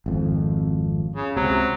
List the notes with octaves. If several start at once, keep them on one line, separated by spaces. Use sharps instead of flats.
G#1 F2
C#3
C#2 C3 F#3